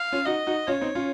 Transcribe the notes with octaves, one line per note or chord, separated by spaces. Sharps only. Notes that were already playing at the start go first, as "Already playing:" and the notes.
Already playing: F5
C#4 F4
D#4 F#4 D#5
D#4 F#4
C#4 F4 C#5
C4 D#4
C#4 F4